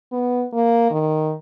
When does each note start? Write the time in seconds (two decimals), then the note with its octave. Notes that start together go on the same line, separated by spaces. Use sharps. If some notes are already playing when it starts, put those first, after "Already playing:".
0.12 B3
0.53 A#3
0.90 D#3